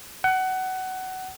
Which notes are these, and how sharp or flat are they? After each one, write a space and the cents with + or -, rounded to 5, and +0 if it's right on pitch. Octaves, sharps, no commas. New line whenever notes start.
F#5 +20